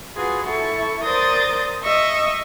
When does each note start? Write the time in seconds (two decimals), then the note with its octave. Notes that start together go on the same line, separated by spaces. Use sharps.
0.15 F4 F#4 G#4 B4
0.46 E4 A4 C#6
1.02 A#4 C5 D5 D#6 G6 A6
1.84 D#5 E5 C#6 D#6